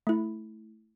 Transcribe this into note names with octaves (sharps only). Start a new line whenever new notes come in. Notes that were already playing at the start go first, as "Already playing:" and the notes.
A3 E4